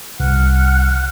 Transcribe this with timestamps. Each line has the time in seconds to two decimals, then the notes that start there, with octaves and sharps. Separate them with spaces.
0.20 C2 F#5 F6 F#6